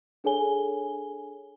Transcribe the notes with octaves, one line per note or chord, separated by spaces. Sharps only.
D4 G#4 A4 C#5 G#5 G7